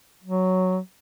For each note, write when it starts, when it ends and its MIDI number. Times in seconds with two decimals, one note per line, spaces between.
0.24 0.78 54